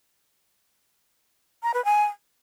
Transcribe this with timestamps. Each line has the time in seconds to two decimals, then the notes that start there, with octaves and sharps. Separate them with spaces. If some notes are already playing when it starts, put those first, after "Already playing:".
1.63 A#5
1.74 B4
1.85 G#5